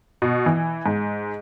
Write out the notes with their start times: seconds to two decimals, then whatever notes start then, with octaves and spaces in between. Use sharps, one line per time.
0.22 B2
0.46 E3
0.86 G#2